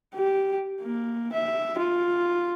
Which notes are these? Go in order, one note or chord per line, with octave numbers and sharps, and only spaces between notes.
G4
A#3
E5
F4